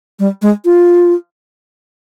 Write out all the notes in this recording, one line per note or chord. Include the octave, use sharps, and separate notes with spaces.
G3
G#3
F4